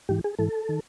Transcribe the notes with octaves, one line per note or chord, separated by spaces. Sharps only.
G#2 E3 G4
G#4
G#2 E3 A4
D#3